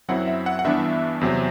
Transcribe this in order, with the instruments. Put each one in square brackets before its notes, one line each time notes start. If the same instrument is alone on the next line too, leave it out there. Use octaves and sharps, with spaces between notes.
[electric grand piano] F#2 F#3 C4 E4 F#5
E5
F#5
F#5
G2 E3 B3 D4 E5
E2 C3 F#3 C4